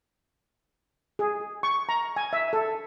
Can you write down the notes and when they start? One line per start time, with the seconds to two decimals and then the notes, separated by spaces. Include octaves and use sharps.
1.19 G#4
1.63 C#6
1.89 A#5
2.16 G#5
2.33 E5
2.53 A4